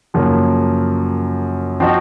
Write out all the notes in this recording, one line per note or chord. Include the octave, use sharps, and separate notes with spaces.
F#2 C#3 F3 A#3
F3 C4 D#4 F#4